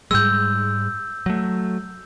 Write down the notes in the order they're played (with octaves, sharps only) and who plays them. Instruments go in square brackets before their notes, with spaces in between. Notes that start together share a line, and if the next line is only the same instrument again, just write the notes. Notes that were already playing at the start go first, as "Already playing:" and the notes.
[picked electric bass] G#2 G3 G#3 [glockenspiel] E6 G6
[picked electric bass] F#3 A3